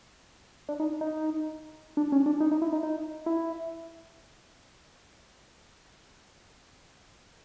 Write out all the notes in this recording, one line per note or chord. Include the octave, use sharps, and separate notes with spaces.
D4
D#4
D#4
D4
C#4
D4
D#4
D#4
E4
D#4
D#4
E4